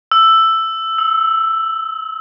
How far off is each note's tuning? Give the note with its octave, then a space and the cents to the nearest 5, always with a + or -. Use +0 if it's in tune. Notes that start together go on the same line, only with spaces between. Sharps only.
E6 +5
E6 -35